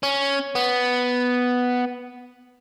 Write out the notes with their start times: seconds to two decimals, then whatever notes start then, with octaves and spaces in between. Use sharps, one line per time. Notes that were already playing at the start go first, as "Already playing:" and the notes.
0.03 C#4
0.55 B3